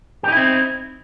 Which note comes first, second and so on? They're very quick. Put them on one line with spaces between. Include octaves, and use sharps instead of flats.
G4 D#4 E4 C4